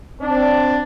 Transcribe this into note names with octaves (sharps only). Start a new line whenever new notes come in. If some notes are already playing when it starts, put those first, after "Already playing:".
C4 D4